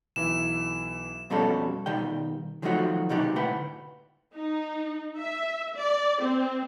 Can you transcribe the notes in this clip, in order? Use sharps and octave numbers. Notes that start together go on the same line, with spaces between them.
B1 E3 E5 E7
F2 B2 G3 C#4 A4
B2 D#3 G3 G5
D#3 F3 F#3 A3 D#4 F#4
C2 B2 D#4 F#4 G4 D5
D2 A2 B4 F#5 G5
D#4
E5
D5
C4